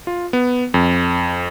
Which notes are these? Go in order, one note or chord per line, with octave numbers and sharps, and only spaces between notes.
F4
B3
F2